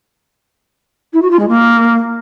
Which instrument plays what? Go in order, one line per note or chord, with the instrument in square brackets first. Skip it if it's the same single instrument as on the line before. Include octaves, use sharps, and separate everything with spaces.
[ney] E4
F#4
F4
G#3
A#3